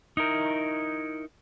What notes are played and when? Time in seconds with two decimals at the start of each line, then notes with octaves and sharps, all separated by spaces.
0.17 D#4 E4 A#4